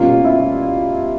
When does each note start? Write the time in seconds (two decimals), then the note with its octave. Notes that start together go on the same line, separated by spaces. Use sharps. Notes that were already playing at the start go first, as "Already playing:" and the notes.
Already playing: B2 G3 A#3 C#4 F4
0.25 E4